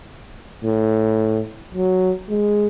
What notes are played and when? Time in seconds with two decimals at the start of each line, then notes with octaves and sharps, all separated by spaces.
0.64 A2
1.74 F#3
2.29 G#3